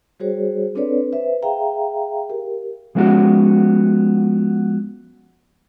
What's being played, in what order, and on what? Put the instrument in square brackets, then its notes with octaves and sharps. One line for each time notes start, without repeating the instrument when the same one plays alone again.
[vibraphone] G3 F#4 G#4 C5 C#5
C4 D4 A4 B4 C#5 D5
B4 C5 E5
G#4 E5 F5 G5 A#5
G4 A#4
[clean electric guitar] F3 G#3 B3 C#4 F#4